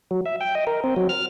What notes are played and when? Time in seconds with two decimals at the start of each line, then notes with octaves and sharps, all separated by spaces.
0.11 F#3
0.26 E5
0.41 G5
0.55 D#5
0.67 A#4
0.84 C4
0.96 F#3
1.09 F6